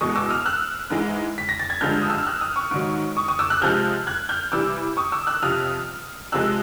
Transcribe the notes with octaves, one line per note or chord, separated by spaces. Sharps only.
E2 B2 G#3 C#6 D#6
D6 E6
D#6 F6
E6 F#6
G#2 E3 G#3
B6
A#6
A6
G#6
G2 D3 F3 G#3 F6 G6
D#6
E6
F6
E6 F#6
D#6 F6
C#6 D#6
G#2 D#3 F#3
C#6 D#6
C#6 D#6
D6 E6
E6 F#6
C3 F3 G#3 F6 G6
F#6 G#6
F6 G6
C3 E3 G3 D6 E6
C#6 D#6
D6 E6
E6 F#6
F2 C3 F3 D#6 F6
C3 F3 G#3 E6 F#6